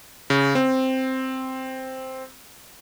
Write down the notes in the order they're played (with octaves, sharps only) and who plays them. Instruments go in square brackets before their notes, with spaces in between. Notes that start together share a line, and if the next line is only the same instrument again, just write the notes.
[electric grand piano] C#3
C4